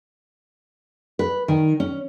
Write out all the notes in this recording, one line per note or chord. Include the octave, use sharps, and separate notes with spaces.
B4
D#3
C#4